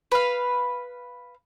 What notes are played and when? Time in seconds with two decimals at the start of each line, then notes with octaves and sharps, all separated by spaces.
0.12 B4 F5